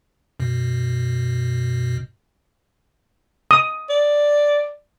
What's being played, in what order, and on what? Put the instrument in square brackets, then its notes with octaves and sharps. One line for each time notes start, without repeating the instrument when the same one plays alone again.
[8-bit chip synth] F#2 B2
[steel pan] D#6
[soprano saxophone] D5